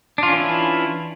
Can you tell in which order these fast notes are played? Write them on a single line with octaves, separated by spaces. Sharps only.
D4 F4 C#4 E3 E4